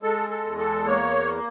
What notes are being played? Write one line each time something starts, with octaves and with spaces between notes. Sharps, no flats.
G#3 A4
A4
E2
A4
A#3 C#5